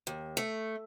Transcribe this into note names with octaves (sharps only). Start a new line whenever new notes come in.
D#2
A3